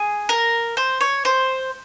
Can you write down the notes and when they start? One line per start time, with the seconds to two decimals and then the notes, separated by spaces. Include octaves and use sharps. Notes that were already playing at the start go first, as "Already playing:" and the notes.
Already playing: G#4
0.29 A#4
0.77 C5
1.01 C#5
1.25 C5